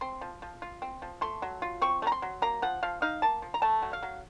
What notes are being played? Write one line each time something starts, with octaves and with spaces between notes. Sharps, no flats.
C4 C6
F3
F3
F4
C4
F3
A3 C6
F#3
F4
C4 C#6
A3
A#5
C6
F#3
A#3 A#5
F3 F#5
F3 F5
D#4 F5
A#3 A5
F3
A#5
A3 A5
F#3
F5
F#3